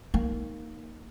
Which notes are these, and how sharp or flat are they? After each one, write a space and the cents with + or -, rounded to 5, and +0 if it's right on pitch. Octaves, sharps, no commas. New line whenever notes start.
A#3 +0 D#4 +0